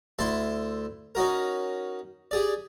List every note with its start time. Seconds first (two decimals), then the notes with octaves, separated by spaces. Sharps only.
0.19 D2 E4 E5 A5 C6
1.15 C#4 D#4 F#4 A#4
2.31 G4 G#4 D5